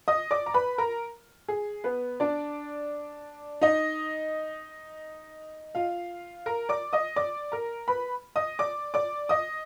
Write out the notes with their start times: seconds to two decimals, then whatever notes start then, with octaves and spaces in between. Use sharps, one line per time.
0.08 D#5 D#6
0.31 D5 D6
0.46 A#5
0.54 B4 B5
0.78 A#4 A#5
1.48 G#4
1.84 B3 B4
2.20 D4 D5
3.61 D#4 D#5
5.75 F4 F5
6.46 A#4 A#5
6.69 D5 D6
6.93 D#5 D#6
7.16 D5 D6
7.52 A#4 A#5
7.88 B4 B5
8.36 D#5 D#6
8.59 D5 D6
8.94 D5 D6
9.29 D#5 D#6